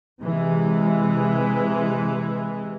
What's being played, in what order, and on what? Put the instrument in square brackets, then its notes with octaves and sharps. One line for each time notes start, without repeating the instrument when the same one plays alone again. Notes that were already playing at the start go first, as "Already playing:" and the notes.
[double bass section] C3 E3 G#3